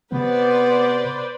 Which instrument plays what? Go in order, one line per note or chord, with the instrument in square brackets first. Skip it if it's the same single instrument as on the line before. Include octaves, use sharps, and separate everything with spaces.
[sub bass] C3 [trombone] B3 [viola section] B4 C5 D5